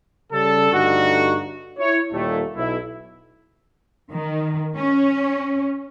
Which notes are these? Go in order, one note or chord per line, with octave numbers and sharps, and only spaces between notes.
C#3 G3 A4
G2 D3 A3 D#4 F#4
E4 C#5
D#2 A#2 G3 A3
B1 E4
D#3
C#4